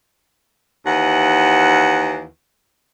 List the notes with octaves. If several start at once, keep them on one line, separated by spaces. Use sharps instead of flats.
D#2 E3 F#5